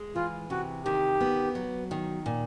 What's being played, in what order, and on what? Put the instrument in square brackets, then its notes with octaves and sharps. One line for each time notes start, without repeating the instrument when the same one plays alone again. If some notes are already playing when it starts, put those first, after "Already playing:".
Already playing: [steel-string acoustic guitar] G#3
[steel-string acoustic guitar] E3 [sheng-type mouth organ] F4
[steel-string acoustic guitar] C3 [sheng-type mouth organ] F#4
[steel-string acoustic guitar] D#3 [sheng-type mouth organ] G4
[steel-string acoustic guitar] B3
F#3
D#3
A#2